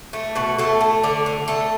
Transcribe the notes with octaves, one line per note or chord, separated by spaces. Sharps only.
A3
B2 F#4
A3 A4
A3
D3 D5
D3
A3 A4